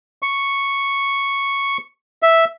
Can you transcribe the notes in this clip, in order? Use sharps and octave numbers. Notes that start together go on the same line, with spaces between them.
C#6
E5